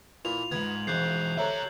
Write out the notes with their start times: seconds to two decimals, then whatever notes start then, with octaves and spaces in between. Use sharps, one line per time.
0.25 A#2 E3 F4 F7
0.51 D#2 G#2 B3 G#6 F#7
0.87 F2 G#2 E3 G#3 F#6 G6 C7
1.37 G4 A4 C#5 E5 A#5 F7 F#7